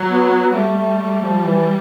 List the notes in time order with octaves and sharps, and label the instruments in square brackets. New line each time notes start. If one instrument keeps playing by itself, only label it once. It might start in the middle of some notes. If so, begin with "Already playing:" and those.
Already playing: [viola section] F#3
[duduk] B3
B3
[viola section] G3 [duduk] A3
[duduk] A3
A3
F3
E3